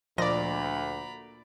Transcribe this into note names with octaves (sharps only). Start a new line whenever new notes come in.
D2 A#2 F3 D5 D#5 A#5 B5 A#6